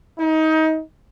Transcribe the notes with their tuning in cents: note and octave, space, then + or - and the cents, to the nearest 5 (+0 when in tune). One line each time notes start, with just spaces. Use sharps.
D#4 +25